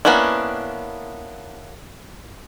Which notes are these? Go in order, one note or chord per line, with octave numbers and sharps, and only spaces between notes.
A#3 B3 C#4 D4 E4